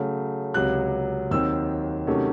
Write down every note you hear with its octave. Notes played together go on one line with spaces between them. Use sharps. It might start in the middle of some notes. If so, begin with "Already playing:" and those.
Already playing: C#3 F#3 A3
C#2 C3 F#3 F#6
D#2 D#3 F#3 C4 E6
C3 D#3 F#3 A3 C#4